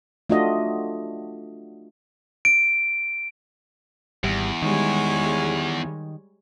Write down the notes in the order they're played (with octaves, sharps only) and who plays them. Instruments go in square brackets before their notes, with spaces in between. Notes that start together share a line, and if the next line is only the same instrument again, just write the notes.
[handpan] A3 D4 F4 F#4 D#5
[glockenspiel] D7
[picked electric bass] G#1 G3 [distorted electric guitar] E2
[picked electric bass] D#3 [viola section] G3 G#3 [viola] C#5 G#5